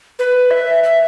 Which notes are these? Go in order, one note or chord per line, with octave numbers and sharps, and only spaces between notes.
B4
E5
E5